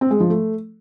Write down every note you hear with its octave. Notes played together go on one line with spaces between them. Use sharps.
C4
G#3
F3
A3